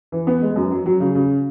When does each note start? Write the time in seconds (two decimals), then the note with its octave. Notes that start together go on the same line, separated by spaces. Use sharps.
0.12 E3
0.27 B3
0.42 G#3
0.56 F#2
0.71 F#3
0.86 F#3
1.00 C#3
1.15 C#3